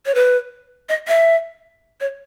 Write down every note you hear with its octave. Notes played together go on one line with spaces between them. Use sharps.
C#5
B4
D#5
E5
C#5